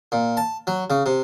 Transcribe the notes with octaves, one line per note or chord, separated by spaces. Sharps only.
A#2
A5
F#3
C#3
C3